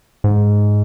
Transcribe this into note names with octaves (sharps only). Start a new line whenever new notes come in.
G#2